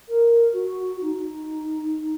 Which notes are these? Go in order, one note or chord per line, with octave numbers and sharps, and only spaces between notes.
A#4
F#4
D#4